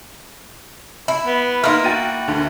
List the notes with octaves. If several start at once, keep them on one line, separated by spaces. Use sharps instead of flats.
E4 B5
B3
A#3 D#4 E4 C6 F6
F#4 G5 A6 D#7
D2 D3